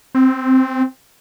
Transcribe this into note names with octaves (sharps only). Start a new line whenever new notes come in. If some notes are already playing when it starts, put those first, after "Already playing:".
C4